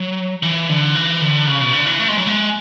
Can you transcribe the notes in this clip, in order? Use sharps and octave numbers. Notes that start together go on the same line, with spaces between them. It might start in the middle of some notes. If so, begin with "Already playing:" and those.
Already playing: F#3
E3
D3
E3
D3
C#3
B2
D3
E3
A3
G#3
F#3
G#3